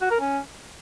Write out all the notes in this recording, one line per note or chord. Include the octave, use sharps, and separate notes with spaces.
F#4
A#4
C#4